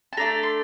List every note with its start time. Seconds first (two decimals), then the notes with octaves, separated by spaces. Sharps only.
0.13 A5
0.17 A3 D4 A4 A#5
0.43 C6